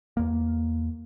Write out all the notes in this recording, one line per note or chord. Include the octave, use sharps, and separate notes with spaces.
E2 A#3